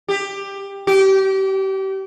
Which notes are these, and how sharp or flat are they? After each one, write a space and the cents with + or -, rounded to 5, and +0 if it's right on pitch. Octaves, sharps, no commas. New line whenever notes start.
G4 +15
G4 -30